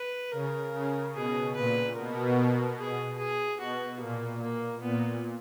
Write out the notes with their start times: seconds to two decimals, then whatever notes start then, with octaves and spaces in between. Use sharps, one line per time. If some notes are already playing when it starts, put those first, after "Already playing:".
Already playing: B4
0.32 C#3 A#4
0.73 C#3
1.14 B2 G#4
1.55 A#2 B4
1.96 B2 A#4
2.78 G#4
3.19 G#4
3.60 B2 F#4
4.00 A#2 A#3
4.42 A#3
4.83 A#2 B3